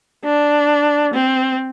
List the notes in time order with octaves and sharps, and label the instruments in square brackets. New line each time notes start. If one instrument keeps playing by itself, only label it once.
[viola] D4
C4